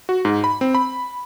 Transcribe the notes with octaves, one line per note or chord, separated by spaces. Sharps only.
F#4
G#2
B5
C4
B5